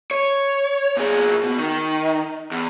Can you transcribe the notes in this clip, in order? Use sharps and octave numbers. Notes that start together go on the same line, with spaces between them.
C#5
A#2 G#4
B2
D#3
E2